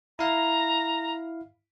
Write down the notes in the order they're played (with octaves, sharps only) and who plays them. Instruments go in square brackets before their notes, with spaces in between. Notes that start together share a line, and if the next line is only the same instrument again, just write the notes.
[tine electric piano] E4 F5 [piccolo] A#5